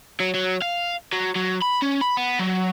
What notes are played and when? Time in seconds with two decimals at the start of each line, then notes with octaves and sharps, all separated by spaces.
0.20 F#3
0.34 F#3
0.62 F5
1.12 F#3
1.35 F#3
1.62 B5
1.82 C#4
2.01 B5
2.17 B3
2.39 F#3